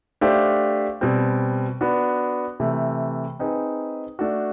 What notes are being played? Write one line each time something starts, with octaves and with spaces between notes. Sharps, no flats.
A3 D4 G4 C5 F5
B2 G3 C4
B3 D4 F#4
C3 E3 A3
C4 D#4 G#4 B4
A3 D4 F#4